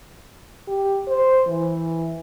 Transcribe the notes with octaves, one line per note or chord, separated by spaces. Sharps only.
G4
C5
E3